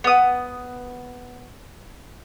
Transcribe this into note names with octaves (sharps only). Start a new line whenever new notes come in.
B3 D#6